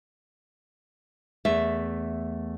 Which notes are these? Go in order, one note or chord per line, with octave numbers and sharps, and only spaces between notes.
E2 A3 E5